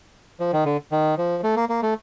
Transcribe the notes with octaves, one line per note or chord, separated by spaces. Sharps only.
F3
D#3
D3
D#3
F3
A3
A#3
A#3
A3